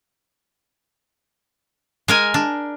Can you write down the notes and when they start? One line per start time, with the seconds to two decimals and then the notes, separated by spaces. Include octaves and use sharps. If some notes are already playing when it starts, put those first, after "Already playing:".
2.08 G#3 A#4 G#5
2.34 D4